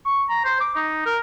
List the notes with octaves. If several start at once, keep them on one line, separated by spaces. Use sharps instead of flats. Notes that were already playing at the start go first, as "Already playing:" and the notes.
C#6
A#5
C5
D6
D#4
A#4